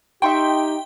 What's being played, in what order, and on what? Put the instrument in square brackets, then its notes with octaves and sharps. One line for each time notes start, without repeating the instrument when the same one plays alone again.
[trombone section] D#4 G4 [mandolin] E5 C6 C#6 [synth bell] G5